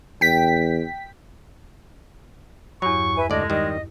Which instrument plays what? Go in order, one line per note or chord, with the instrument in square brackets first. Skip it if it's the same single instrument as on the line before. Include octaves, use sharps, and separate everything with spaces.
[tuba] E2 [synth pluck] G5 B6
[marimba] E2 G2 [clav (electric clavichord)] F#3 [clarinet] C#6
[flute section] B4 E5 G#5
[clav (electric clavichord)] D2 D5 [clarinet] G#3 [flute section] A4 D#5
[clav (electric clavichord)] D#3 G3 [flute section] D#5